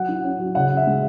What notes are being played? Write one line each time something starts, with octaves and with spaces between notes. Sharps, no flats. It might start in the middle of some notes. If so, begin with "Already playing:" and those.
Already playing: F#3 F#5
E4
C#4
F#3
C#3 F#5
C#4
E5
G#3